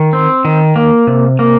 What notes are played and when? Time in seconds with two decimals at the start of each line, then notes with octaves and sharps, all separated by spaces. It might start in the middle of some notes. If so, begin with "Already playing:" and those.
Already playing: D#3
0.13 C4
0.45 D#3
0.76 A#3
1.07 C3
1.39 A#3